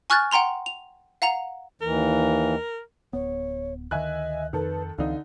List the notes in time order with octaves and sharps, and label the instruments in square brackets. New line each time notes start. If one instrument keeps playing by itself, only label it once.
[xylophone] G#5 C#6 F6 F#6 G#6 A6
F#5 G5 A#5 C6 F7
F7
F5 F#5 A#5 F7
[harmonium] D#2 E3 [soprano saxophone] A#4
[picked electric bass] D1 B3 [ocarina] C#5
[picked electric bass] D2 D#3 [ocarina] D#5 [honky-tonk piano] E5 G#5 F#6
[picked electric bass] F2 [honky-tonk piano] D#3 A4 [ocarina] B4
[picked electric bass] C#2 E3 C4 [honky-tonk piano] D3 D#4 [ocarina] F5